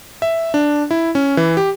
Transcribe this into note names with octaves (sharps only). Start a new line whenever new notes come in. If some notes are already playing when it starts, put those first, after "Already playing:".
E5
D4
E4
C#4
E3
G4